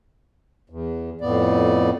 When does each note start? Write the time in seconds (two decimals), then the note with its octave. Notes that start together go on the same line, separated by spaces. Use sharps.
0.70 E2
1.21 F2 A2 B3 D5